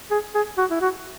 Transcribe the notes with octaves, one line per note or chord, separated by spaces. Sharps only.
G#4
G#4
F#4
E4
F#4